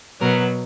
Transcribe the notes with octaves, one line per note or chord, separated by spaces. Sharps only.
B2 F#3 B3 A#4